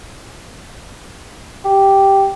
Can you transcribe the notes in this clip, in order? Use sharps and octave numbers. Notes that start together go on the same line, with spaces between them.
G4